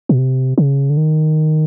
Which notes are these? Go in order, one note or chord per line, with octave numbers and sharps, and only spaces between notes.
B2
C3
C#3
D3
D#3